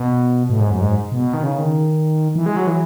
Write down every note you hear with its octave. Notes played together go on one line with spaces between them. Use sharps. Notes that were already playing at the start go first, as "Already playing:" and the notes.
Already playing: B2
A2
G#2
F#2
G#2
B2
D#3
C#3
D#3
E3
G#3
F#3
E3